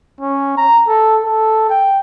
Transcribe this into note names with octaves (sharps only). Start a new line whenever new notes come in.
C#4
A#5
A4
A4
G5